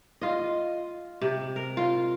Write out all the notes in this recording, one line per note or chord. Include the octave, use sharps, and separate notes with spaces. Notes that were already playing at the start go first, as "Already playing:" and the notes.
F4 D#5
C3
A#4
F4